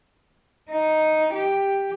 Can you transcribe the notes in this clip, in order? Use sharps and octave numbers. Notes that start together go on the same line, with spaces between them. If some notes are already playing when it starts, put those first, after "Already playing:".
D#4
G4